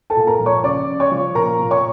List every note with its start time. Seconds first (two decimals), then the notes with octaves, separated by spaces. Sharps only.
0.10 A4 A5
0.16 A#2
0.27 A#4 A#5
0.40 F3
0.46 C#5 C#6
0.63 C#3 D5 D6
0.88 C#3
1.00 C#5 C#6
1.12 F3
1.35 A#2 A#4 A#5
1.59 A#2
1.70 C#5 C#6